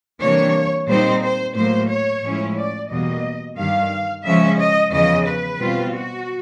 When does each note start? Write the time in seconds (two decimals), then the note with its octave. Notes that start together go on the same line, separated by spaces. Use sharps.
0.21 C3 E3 G3 A#3 D4 C#5
0.89 A#2 G3 C4 D#4 C5
1.22 C5
1.56 A2 F#3 A#3 C5
1.90 C#5
2.23 A2 F3 G#3 C#4 E4
2.57 D5
2.90 E2 B2 G3 A#3 D#5
3.58 G2 D#3 G3 F5
4.25 C#3 F3 G#3 C#4 E5
4.59 D#5
4.92 E2 C#3 F3 D#5
5.26 B4
5.60 B2 G3 C4 F4
5.94 F#4